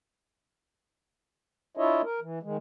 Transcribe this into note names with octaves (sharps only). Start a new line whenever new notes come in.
D4 E4 F4 C#5 D#5 E5
A#4
E3
D#3 G#3